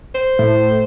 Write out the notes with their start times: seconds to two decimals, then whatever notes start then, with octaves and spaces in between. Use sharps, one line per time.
0.15 C5
0.39 A2